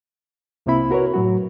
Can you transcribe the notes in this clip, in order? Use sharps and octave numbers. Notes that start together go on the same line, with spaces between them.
C2 C3 A#3 C4 E4 B5
F#4 A#4 B4 C#5
A2 F#3 F#4